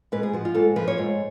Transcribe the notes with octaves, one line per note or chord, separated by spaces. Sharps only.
G#2 B4
G#4
F3 F#4
F4
G#2 A4
F3 B4
C#5
G#2